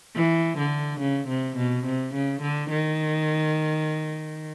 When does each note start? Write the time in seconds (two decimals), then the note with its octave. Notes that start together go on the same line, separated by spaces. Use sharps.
0.16 E3
0.58 D3
1.01 C#3
1.28 C3
1.57 B2
1.85 C3
2.14 C#3
2.42 D3
2.70 D#3